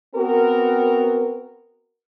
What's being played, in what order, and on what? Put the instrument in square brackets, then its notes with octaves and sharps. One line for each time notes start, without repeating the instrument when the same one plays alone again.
[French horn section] B3 C4 F#4 A#4